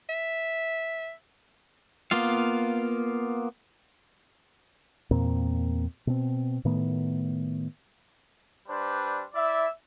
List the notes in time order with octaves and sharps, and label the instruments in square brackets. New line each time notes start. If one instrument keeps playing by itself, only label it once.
[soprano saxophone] E5
[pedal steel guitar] A#3 B3 F4 F5
[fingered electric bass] E2 A#2 A#3 C4
B2 C4
A2 D#3 A3 B3
[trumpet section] G3 D4 B4 C5
E4 D5 E5